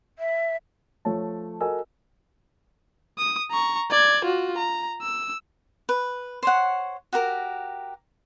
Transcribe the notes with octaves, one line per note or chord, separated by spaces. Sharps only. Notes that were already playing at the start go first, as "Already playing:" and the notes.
E5
F3 A3 C#5 A5
F#4 A4 A#4 D#5 G#5 E6
D#6
A#5 C#6
D5 G#6
F4 F#4
A#5
E6
B4
C5 C#5 F#5
F#4 G4 A#4